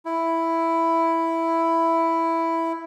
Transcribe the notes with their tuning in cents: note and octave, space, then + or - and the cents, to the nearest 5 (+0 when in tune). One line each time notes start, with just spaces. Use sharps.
E4 +5